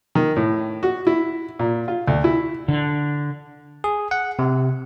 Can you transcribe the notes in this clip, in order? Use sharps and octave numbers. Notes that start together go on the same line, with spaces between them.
D#3
A2
F#4
E4
A#2
F4
D2
E4
D3
G#4
F#5
C3